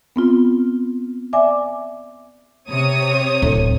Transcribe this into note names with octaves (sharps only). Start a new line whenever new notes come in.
B3 C4 F4
D5 E5 G#5 D6
C3 C#5 D#6
D1